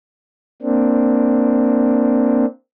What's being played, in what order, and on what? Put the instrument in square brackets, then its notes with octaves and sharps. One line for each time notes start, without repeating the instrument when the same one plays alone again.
[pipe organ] A#3 C4 D4